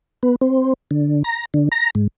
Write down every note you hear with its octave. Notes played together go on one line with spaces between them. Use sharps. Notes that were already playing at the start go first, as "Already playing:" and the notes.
B3
C4
D3
A#5
D3
A#5
G#2